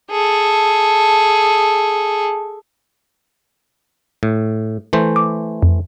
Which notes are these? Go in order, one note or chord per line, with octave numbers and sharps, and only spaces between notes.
G#4 A4
A2
E3 A3 C5
D6
F2